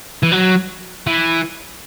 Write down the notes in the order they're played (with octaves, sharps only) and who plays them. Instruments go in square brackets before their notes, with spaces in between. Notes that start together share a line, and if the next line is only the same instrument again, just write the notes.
[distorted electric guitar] E3
F#3
E3